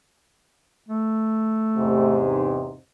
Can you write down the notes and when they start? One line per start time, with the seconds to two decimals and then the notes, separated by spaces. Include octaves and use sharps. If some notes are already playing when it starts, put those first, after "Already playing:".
0.89 A3
1.77 E2 G#2 C3